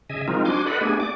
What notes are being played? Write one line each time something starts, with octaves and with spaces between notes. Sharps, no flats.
C#3 D#5 E5 G#5
F3 G#3 C4 D#4 F4 A#4
D4 F#4 G#5 C6 D6
A4 B4 D5 D#5 F#5 B5
A3 B3 D4 G4 G#4 G#5
D5 D6